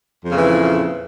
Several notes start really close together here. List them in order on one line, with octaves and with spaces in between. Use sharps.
F2 C#3 A#2 E3